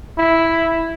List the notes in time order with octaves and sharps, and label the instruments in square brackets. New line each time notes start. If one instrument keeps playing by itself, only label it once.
[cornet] E4